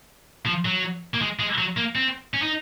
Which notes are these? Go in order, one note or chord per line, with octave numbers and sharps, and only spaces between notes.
F3
F#3
A#3
G#3
G#3
F#3
A#3
C4
C#4
D#4